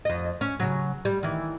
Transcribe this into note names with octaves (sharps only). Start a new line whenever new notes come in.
F2 D#5
C#4
C#3 F#3
G3
D#3 E3